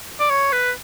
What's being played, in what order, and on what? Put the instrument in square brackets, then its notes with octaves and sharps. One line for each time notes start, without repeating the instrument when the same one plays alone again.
[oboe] D5
C#5
B4